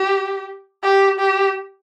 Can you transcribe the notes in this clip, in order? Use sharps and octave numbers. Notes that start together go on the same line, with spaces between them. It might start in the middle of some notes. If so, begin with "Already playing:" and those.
Already playing: G4
G4
G4